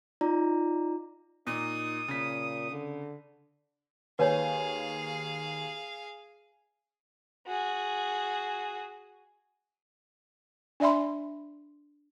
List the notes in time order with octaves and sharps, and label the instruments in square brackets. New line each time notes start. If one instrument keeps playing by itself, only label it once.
[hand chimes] D#4 F4 D5 A#5
[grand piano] A#2 [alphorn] D#4 [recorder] D#6
[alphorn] A#2 [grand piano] C#3 B6
[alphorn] D3
[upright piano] D#2 G#5 [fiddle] G#4 F5 [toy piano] B4 C#5
[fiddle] F#4 G#4
[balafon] D4 D5 E5 B5 C6